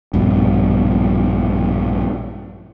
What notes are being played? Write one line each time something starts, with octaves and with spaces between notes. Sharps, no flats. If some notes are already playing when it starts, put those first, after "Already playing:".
A#1 G2 B2